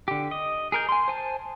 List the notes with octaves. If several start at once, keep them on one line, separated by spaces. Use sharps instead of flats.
D3 G4
D#5
G#4 A#4 G6
G#5 C6
C5 G#5 A5